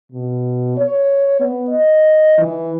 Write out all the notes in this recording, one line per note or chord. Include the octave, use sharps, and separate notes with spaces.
B2
C#5
B3
D#5
E3